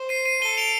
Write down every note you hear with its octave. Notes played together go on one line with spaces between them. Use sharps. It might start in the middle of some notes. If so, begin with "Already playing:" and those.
Already playing: C5
C7 D#7
C7 D#7
A4 D#7 G7
D7 F7